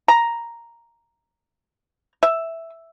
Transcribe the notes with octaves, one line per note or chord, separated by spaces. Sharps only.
A#5
E5